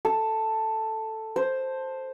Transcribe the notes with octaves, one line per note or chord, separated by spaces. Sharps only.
A4
C5